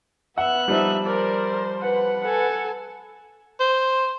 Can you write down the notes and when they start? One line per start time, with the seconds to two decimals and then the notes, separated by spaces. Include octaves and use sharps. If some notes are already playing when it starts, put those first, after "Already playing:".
0.38 B3 E5 F#5 F#6
0.68 F3 G3 D#4 E5
1.06 A#4 C5 D5
1.82 B4 F#5
2.24 A4 G#5
3.60 C5